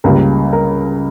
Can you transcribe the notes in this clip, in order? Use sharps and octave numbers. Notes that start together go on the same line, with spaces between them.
C#2 C#3 G3 A#3 A#4
A#4